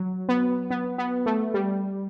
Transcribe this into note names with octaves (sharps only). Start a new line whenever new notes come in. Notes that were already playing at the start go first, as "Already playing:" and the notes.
Already playing: F#3
B3
B3
B3
A3
G3